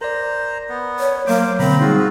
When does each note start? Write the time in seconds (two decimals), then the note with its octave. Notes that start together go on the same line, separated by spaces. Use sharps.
0.01 A#4 C5 D5 A#5
0.69 B3
1.00 C#5
1.27 F#3 A#3 C5 D6
1.59 B2 D3 A#3 C4 A#5 B5
1.81 G3 D#4 F4 F#4 G#4